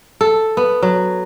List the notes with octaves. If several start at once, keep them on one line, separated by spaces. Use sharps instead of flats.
A4
B3
F#3